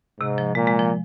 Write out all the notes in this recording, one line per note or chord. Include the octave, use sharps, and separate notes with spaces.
G#2 C3
F3
A#2 G#3
G#3
F3